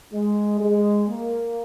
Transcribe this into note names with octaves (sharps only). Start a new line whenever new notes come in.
G#3
G#3
A#3